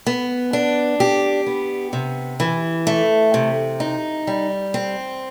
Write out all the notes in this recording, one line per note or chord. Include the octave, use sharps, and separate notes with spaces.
B3
D4
G4
B3
C3
E3
A3
C3
D#4
G3
C4